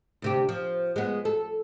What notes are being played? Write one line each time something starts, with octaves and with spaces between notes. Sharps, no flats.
D2 C3 G4
F3
G#3 B3
A4